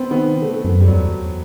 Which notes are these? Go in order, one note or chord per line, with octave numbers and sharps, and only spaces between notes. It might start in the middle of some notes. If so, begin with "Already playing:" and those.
Already playing: B3 C4
D#3 B3
A3
F#2
G3
E2 F#3